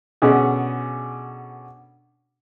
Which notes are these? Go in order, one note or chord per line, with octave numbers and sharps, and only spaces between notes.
B2 D3 C#4 G#4